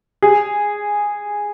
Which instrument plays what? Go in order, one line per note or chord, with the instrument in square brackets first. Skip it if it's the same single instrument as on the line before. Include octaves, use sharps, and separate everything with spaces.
[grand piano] G#4